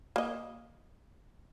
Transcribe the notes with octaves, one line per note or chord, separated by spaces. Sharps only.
A#3 D#5